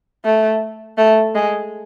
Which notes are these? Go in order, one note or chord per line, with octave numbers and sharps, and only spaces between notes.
A3
A3
G#3